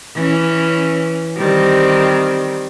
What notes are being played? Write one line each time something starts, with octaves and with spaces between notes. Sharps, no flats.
E3 C#4
D#3 G3 C4